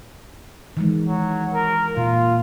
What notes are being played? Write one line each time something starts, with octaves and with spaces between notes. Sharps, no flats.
D#3 E3 G#3
F#3
A#4
A#2 F4